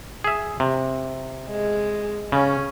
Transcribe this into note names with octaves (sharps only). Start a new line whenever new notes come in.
G#4 E5
C3
G#3
C#3 C#4